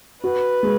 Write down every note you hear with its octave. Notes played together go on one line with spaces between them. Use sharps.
F#4 B4
G#3